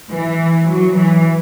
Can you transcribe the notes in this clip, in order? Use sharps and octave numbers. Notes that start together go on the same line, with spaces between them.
E3
F#3
E3